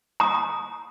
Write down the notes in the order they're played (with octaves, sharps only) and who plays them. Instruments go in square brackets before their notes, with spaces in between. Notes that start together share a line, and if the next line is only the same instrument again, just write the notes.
[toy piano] A#5 D#6